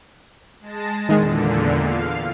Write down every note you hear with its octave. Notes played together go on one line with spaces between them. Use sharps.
G#3 A5 A#6
E2 A#2 D3 D#3 G#3
F5